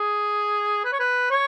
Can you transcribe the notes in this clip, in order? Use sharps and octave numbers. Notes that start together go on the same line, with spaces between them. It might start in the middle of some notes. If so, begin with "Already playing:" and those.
Already playing: G#4
B4
C#5
B4
C#5